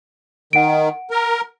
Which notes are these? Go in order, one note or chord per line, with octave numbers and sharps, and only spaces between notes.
D#3 F#5 D7
A#4